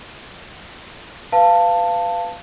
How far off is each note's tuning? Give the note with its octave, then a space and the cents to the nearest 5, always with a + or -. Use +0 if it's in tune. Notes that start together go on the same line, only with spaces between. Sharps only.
B4 +15 F5 -10 A5 +15